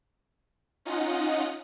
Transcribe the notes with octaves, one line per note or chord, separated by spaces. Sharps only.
C#4 D#4 F4 D#5 F#5